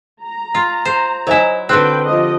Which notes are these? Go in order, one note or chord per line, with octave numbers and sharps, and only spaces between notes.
A#5
F4
C5
F#3 E4 C5 D#5 G#5
D3 C4 F#4 B4 G5 F#6
F3 G4 D#5